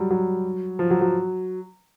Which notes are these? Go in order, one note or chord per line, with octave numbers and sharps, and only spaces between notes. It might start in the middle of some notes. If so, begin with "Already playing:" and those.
Already playing: F#3 G3
F#3
F3
F#3
F#3